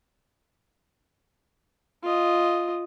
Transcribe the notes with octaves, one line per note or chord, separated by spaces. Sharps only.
F4 D#5